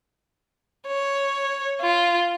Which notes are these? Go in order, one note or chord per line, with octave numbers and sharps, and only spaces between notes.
C#5
F4